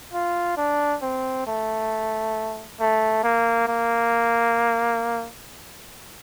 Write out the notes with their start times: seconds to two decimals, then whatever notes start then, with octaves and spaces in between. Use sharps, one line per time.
0.13 F4
0.57 D4
1.02 C4
1.47 A3
2.80 A3
3.23 A#3
3.67 A#3